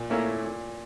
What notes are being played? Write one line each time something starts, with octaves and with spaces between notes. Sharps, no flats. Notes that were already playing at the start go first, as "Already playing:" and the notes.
Already playing: A#2
A3 A#3 C#4 E4
A#2